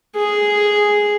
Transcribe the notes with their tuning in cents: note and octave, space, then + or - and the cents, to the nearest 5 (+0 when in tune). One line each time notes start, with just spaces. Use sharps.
G#4 +0